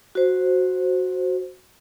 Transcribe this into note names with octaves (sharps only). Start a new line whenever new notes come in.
F#4 C5